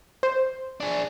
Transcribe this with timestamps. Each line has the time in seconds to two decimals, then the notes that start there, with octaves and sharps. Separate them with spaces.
0.23 C5
0.80 D4 G#4